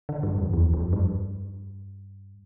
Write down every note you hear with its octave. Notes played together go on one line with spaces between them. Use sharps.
D3
G2
F2
E2
F2
G2